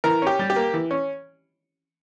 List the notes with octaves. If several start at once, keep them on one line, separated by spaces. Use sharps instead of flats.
E3 A#4
C#4 G4
G3
G4
A#3
E3
C#4